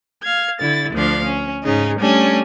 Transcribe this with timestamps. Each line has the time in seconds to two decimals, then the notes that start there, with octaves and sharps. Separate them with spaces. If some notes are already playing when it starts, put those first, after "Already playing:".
0.22 F5 G#6
0.59 D3 E4 A6
0.94 D2 F3 D4 F5
1.25 C#4
1.63 G#2 C#3 C#4 D#4
1.99 G3 A3 C#4 D4